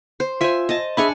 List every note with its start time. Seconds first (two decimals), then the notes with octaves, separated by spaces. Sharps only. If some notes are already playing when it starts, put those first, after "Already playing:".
0.20 C5
0.41 F4 C5 E5 G#5
0.69 D#5 A5
0.97 D4 G#4 E5 G#5 B5 C#6